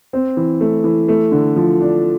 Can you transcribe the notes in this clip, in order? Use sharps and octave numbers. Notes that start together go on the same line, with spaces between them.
C4
E3
A3
E3
A3
D3
F3
D4